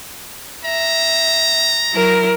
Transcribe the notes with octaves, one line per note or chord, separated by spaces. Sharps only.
E5 A#5
F#3 E4 A#4